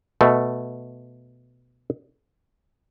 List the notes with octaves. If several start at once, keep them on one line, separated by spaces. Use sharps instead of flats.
B2 A3